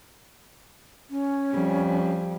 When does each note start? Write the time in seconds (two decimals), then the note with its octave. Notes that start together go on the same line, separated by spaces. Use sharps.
1.10 C#4
1.51 F2 G3